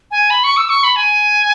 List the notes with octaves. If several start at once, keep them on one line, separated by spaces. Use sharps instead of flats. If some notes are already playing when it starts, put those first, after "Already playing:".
G#5
B5
C#6
E6
C#6
B5
G#5